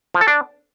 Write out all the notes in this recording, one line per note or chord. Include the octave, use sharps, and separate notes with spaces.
F3
A4
D4